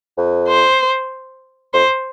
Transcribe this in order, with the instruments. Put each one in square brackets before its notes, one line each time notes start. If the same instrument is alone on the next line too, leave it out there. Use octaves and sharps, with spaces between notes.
[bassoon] F2
[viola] C5
[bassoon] F2 [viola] C5